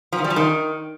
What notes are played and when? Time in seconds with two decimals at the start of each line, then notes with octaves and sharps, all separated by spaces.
0.13 F3
0.18 D#3
0.24 G3
0.30 F3
0.36 D#3